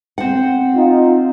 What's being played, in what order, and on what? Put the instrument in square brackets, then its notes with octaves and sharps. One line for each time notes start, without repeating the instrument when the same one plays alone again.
[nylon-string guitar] C4 F#5
[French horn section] D#4 F4